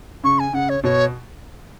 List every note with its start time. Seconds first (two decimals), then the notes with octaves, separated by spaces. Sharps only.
0.24 C#3 C#6
0.39 G#5
0.53 C#3 F#5
0.69 C#5
0.84 B2 C#5